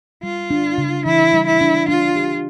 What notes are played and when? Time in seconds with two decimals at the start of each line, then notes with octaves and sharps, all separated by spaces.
0.23 G3 F4
0.50 D4
0.78 C#3
1.05 E3 E4
1.33 G3
1.46 E4
1.61 D4
1.88 D4 F4
2.16 G4